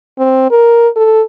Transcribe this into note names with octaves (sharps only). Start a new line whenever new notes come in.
C4
A#4
A4